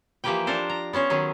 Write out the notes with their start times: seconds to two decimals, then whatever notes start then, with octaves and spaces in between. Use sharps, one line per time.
0.24 E3 F3 A#3 G4 B4 G5
0.47 D4 A4 A#4 C5
0.70 A#5
0.93 B3 C#4 C5 C#5
1.10 D#3 F#3 G#4